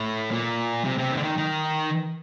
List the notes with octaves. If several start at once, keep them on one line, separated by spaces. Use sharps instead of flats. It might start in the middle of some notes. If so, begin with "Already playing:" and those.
Already playing: A2
A#2
C3
C3
D#3
D3
D#3
D#3